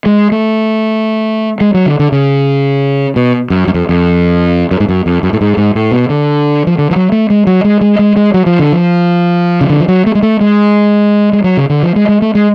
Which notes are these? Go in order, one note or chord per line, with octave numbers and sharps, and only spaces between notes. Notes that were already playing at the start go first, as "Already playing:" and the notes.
G#3
A3
G#3
F#3
D3
D3
C#3
B2
F#2
F#2
F2
F2
F#2
G#2
F#2
F2
F#2
A2
G#2
G#2
A2
B2
D3
F3
D3
F3
F#3
A3
G#3
F#3
G#3
G#3
G#3
G#3
F#3
F3
D3
F3
C#3
D3
F3
F#3
A3
G#3
A3
G#3
G#3
F#3
C#3
D3
F3
G#3
G#3
A3
G#3